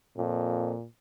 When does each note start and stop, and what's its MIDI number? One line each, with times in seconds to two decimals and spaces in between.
0.17 0.73 41
0.17 0.85 46